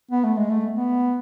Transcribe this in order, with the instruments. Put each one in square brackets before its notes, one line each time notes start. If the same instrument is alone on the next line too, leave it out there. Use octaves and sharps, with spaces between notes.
[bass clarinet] B3
A3
G#3
A3
B3